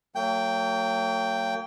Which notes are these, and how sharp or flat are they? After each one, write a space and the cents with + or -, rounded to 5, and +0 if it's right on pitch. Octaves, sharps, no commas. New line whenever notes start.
F#3 +0 A#3 -40 G5 +0